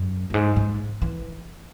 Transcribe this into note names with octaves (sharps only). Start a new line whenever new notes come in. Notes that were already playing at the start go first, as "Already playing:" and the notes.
Already playing: F#2
F#2
G#2
G#2
E3